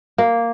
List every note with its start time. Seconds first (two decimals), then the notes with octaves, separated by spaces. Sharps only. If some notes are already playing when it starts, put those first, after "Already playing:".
0.18 A#3